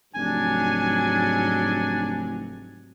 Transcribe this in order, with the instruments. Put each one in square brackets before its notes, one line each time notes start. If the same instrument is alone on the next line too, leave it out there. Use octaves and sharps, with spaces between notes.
[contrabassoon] F1 [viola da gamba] G#2 F#3 [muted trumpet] D4 [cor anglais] G#5